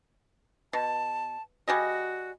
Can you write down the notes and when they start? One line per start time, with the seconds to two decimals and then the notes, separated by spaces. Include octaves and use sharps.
0.73 B2 A5
1.68 G3 F#4 G#4 D#5